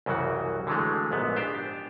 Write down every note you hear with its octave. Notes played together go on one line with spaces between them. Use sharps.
C2 F#2 C#3 E3 F#4
D3 E3 F#3 G#3 A3
A#1 G#2 B3
D4 G4 C5